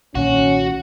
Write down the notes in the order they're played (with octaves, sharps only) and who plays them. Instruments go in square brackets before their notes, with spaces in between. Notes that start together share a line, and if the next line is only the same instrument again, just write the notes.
[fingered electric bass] B1 A#2 D#3 [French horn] C#4 [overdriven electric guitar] F#4